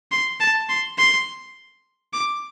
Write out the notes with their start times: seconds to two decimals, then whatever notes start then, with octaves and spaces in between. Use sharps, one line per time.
0.12 C6
0.40 A5
0.69 C6
0.98 C6
2.13 D6